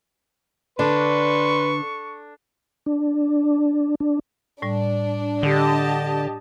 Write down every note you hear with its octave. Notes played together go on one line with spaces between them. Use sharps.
D3 D4 B4 C6 C#6
D4
D4
A2 G3 D4
D3 G4 D#5 A5